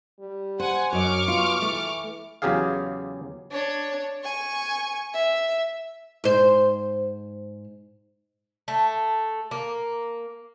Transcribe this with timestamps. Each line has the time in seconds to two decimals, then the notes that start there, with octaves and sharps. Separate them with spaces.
0.20 G3
0.60 C5 F#5 G#5
0.93 F#2 F#3 D#5 C#6 D6 F6
1.28 B2 F4
1.62 E3 A3
2.42 E2 C#3 F#3 G4 G#4 F5
3.52 D4 C#5
4.23 G#5 C#6
5.14 E5
6.24 G#2 C5
8.68 A3
9.51 A#3